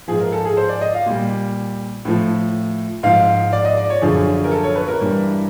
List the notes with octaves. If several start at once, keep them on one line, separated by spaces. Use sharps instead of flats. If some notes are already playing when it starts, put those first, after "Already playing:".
G#2 F3 G#4
A#4
A4
G#4
C5
D5
D#5
F5
A#2 G3
A2 F3
G#2 F3 F5
D5
D#5
D5
C#5
F#2 D3 F3 G#4
A#4
A4
C#5
B4
A#4
G2 E3 G3